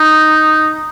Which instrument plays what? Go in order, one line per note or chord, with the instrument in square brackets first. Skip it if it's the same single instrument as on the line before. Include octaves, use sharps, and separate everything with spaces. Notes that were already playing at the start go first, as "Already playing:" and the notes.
Already playing: [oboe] D#4